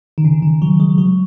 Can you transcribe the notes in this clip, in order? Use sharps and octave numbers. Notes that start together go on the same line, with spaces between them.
D#3
C#3
D#3
F#3
G#3
F#3